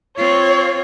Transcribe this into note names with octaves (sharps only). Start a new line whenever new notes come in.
C4 F4 C#5